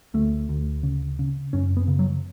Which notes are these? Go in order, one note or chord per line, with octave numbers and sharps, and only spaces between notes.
D2 A3
D2
C#3
C#3
F#2 C#4
B3
C#3
F#3